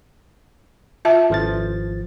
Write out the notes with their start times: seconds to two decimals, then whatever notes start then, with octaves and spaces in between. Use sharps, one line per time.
1.05 F4 E5 A5
1.30 G#1 F3 A6